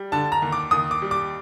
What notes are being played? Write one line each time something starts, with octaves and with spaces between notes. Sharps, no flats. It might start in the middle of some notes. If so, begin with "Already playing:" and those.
Already playing: G3
D3 A5
A#5
D#2
D6
D#2 D#6
D6
G3
D6